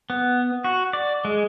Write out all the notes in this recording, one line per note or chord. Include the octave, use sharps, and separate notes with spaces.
B3
F#4
D5
G#3